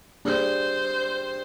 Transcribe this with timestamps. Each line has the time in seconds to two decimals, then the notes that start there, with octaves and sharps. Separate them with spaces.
0.25 G3 D4 G#4 C5 D5